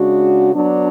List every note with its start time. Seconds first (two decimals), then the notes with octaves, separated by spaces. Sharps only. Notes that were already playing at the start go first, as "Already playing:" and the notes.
Already playing: C#3 G#3 D4 F#4
0.53 F#3 B3 D4